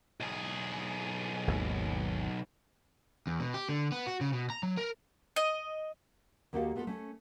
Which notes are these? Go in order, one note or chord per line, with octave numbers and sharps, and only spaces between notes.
B1 G#4
G#1 D#2
E2
B2
G4
D3
B3
F#4
C#3
B2
A#5
F#3
A#4
D#5
D#2 A#3 F#4 G4 A4 F5
A3 B3 F4 G#4 A4
A3 C#4